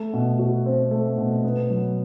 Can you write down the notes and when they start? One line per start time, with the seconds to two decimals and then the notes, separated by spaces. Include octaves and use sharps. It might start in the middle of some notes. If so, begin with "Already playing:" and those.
Already playing: A3
0.13 B2
0.39 F#4
0.66 C4
0.91 A3
1.18 B2
1.44 B3
1.70 F#3